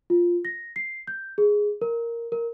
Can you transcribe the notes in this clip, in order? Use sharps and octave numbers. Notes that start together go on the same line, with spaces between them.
F4
A#6
C7
G6
G#4
A#4
A#4